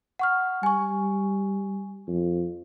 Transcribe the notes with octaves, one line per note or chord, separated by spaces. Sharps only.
F#5 C#6 F6
G3 G#5 C#6
F2